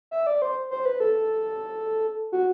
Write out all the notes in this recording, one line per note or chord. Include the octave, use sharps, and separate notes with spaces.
E5
D5
C5
C5
B4
A4
F#4